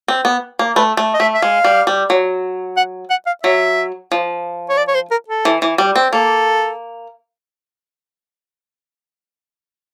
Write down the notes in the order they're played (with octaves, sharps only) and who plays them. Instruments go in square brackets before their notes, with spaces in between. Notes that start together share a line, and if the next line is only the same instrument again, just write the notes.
[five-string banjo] C4
B3
A#3
[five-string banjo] A3 [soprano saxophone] B4
[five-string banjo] A3
[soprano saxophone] D#5
[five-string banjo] A3 [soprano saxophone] E5
[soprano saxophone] E5
[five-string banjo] G#3 [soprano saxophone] F5
[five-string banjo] G3
G3
F#3
[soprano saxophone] F#5
F#5
F5
[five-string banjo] F#3 [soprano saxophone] E5
[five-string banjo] F3
[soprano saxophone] C#5
D5
C#5
C5
A#4
A4
[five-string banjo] E3
E3
G3
C4
[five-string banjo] A#3 [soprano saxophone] A4